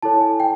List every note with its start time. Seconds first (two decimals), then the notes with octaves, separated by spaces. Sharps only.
0.02 E4 A4 C#5 A5
0.21 G#5
0.40 G5